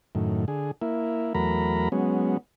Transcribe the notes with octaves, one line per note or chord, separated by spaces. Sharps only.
F#2 A2 D#3
D3 G#4
A#3 E4
E2 F#3 A3 A#4 A#5 B5
F#3 G#3 B3 C#4